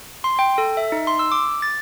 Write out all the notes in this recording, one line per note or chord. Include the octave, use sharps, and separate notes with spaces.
C6
G5
A4
E5
D#4
C6
E6
D6
A6